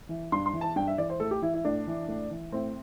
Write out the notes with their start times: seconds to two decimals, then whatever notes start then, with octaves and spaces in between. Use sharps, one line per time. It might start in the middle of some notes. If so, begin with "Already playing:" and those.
0.09 E3
0.32 G2 C6
0.46 C6
0.53 E3
0.61 A5
0.76 G2 G5
0.87 E5
0.98 E3 D5
1.10 C5
1.20 A2 A4
1.31 G4
1.42 E3 E4
1.54 E4
1.65 A2 D4
1.87 E3
2.08 A2
2.31 E3
2.52 A2 C4